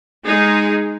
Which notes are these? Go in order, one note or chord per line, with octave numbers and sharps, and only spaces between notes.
G#3 D#4 G#4